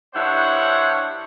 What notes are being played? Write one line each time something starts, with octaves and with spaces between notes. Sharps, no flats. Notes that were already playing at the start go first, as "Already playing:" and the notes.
G2 D4 E4 C5 C#5 F#5